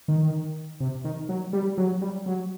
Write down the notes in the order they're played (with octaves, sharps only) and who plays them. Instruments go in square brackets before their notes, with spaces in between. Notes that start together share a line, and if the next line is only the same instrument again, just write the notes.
[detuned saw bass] D#3
C3
D#3
F#3
G3
F#3
G3
F#3